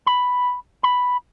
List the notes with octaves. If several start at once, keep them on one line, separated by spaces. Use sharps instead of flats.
B5
B5